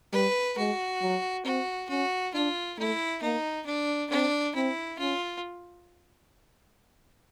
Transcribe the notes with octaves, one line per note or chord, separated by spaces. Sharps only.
G3 B4
G#3 F#4
F#3
C4 F#4
C#4 F#4
D4 F4
A3 E4
A#3 D#4
D4
C4 D4
C4 E4
C#4 F4